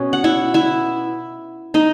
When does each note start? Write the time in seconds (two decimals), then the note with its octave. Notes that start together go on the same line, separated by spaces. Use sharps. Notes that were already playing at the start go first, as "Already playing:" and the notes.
Already playing: B2 C#4
0.13 F#5
0.24 E4 E5
0.54 E4 E5
1.74 D#4 D#5